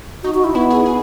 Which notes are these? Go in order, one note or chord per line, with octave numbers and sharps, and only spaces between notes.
D#4 F#4
F#4
E4
B3 E4
G#4
G#4